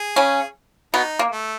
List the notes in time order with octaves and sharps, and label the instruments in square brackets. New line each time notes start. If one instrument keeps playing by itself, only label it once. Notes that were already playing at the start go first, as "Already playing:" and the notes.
Already playing: [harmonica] G#4
[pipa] C#3 C#4
[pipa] B2 B3 [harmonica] D#4
[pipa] A#3
[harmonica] A3